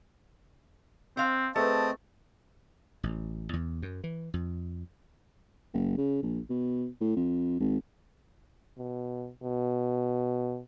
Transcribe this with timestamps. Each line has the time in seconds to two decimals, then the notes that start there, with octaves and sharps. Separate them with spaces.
1.17 C4 C5 F5
1.56 A3 C4 G#4 A4 B4 D#5 A5
3.03 A1
3.53 E2
3.82 F#2
4.04 E3
4.34 F2
5.74 F#1
5.98 C#3
6.23 A#1
6.50 B2
7.01 A2
7.16 F2
7.60 G#1
8.78 B2
9.43 B2